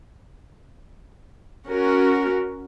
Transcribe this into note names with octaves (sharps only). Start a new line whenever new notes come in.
C#4 F#4 A#4